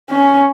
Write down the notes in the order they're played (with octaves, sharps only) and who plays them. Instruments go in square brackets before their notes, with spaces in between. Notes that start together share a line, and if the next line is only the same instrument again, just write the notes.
[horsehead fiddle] C#4